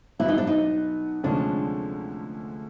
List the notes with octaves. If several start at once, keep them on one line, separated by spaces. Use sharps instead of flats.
B2 F#3 B3 E4
D#4
D4
D#4
D2 C3 F3 G#3 C#4 D4